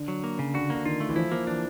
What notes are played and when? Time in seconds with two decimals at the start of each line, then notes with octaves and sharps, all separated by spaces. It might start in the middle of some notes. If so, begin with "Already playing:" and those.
Already playing: D3
0.08 F#3
0.24 A#3
0.39 C#3
0.54 D3 F#4
0.70 D3 A#3
0.85 D#3 F4
1.00 A3
1.09 E3
1.16 F3 E4
1.32 F3 A#3
1.47 E3 D4